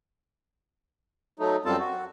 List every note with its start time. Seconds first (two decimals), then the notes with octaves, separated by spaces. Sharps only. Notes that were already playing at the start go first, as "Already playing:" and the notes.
1.39 F#3 A3 D#4
1.65 F#2 G3 C4 F4 A4 A5
1.79 F#4